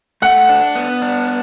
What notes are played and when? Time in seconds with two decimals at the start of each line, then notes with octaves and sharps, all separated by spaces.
0.22 A3 F#5
0.49 D4
0.75 B3
1.02 D4